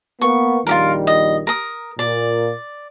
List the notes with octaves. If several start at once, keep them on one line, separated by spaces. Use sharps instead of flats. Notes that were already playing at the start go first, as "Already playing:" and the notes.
A#3 B3 C#6
A#1 D#3 G3 F4 G4 A#4
D#5
A#4 D#6
A#2 D5